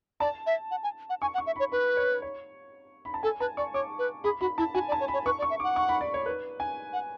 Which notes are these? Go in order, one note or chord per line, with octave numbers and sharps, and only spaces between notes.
D5 A5
E5
F#5
G#5
F#5
G#5 C#6
F#5
C#6
E5
C#5 B5
B4 B5
C#5
C#5
B5
A5
A4 G#5
B4 A5
D5 C#6
C#5 D6
B4
G#4 B5
F#4 B5
E4 A5
F#4 G#5
D5
A5
C#5
B5
C#5
B4 C#6
D5
C#6
E5
F#5 D6
C#6
B5
D5
C#5
B4
G#5
F#5